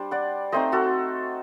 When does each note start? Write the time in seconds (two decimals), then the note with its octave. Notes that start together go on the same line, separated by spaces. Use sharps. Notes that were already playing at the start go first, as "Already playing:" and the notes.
Already playing: G3 D4 C5
0.11 D5 F#5
0.52 A3 C4 D#4 C5 D#5
0.72 F#4 A4